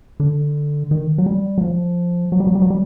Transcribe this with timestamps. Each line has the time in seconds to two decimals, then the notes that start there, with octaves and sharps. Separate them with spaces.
0.20 D3
0.91 D#3
1.18 F#3
1.26 G3
1.58 F#3
1.62 F3
2.32 F#3
2.40 G3
2.47 F#3
2.55 G3
2.62 F#3
2.70 G3